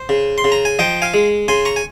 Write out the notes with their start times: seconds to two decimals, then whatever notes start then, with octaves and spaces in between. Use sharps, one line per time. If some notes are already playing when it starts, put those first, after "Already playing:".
Already playing: C5
0.09 C#3
0.38 C6
0.44 C#3
0.52 A#5
0.65 G#5
0.79 F3 D#5 G5
1.02 F5 G#5
1.14 G#3
1.48 C#3 G#5 C6
1.65 A#5 C#6
1.76 G#5